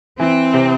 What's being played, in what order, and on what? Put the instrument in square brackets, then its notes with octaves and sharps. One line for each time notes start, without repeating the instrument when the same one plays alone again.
[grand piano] E3 [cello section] C4
[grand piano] C3